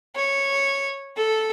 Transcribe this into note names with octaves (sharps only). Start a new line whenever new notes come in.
C#5
A4